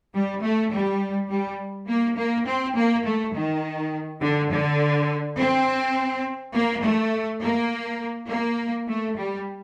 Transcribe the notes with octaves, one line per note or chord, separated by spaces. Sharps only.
G3
A3
G3
G3
A#3
A#3
C4
A#3
A3
D#3
D3
D3
C4
A#3
A3
A#3
A#3
A3
G3